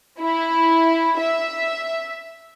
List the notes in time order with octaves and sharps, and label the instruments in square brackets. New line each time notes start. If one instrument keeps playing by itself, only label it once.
[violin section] E4
E5